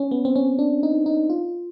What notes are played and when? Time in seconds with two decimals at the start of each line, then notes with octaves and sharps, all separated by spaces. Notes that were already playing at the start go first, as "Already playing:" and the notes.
Already playing: C#4
0.11 B3
0.25 C4
0.36 C#4
0.59 D4
0.83 D#4
1.06 D#4
1.30 F4